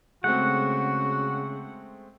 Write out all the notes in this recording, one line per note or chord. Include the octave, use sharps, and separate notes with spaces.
C#3 G#3 A3 C4 F#4 F#5